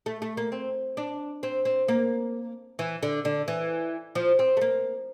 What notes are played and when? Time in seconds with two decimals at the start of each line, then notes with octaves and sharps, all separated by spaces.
0.06 A3
0.22 A3
0.37 A#3
0.52 C4
0.97 D4
1.43 C4
1.65 C4
1.88 A#3
2.79 E3
3.03 D3
3.25 D3
3.48 E3
4.15 F3
4.39 C4
4.57 A3
4.61 A#3